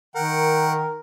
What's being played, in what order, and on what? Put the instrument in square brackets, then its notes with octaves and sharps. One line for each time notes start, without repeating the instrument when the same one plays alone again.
[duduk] D#3 [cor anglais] A#4 [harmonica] F#5 G5